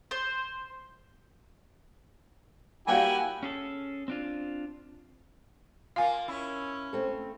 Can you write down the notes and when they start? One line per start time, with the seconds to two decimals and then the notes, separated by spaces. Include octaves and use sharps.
0.11 C5
2.87 G3 A#3 E4 F#4 G4 G#5
3.43 C#4 G#4 A4
4.08 C4 D4 F4
5.96 A#3 F4 F5 G#5
6.28 C#4 E4
6.93 A3 C4 A4